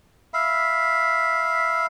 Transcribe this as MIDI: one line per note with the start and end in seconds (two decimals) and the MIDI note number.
0.34 1.86 76
0.34 1.86 77
0.34 1.86 83